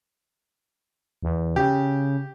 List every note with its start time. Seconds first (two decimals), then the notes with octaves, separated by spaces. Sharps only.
1.23 E2
1.56 C#3 G4